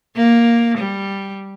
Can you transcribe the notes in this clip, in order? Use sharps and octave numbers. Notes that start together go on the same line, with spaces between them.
A#3
G3